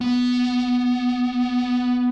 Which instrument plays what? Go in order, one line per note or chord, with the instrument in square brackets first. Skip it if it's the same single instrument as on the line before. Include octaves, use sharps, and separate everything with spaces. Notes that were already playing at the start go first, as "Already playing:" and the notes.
[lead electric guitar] B3